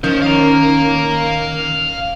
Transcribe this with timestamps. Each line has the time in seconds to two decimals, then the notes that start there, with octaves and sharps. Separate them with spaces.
0.04 D#3 F3 C#4 C5
0.22 F5 A#5